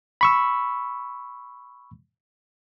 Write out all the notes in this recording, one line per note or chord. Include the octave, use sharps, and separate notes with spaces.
B5 C#6 E6